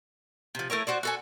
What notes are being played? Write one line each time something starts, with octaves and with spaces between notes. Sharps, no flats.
C3 F3
A3 E4 A#4 C#5
F#4 C5 D5
F#4 A4 G#5